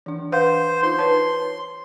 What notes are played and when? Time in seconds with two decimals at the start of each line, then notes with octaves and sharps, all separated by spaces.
0.06 E3 D4
0.32 B4 C5 F5 F#5
0.83 D#4 F4 C6
0.98 B4 C#5 A5